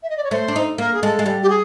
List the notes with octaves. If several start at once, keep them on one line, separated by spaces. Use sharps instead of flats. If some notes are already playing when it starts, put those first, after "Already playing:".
E5
D#5
D5
C#5
A3 C5
D4
D#4
A#3 A#4
G#4
G#3 A4
G#3
G3
G4
G#4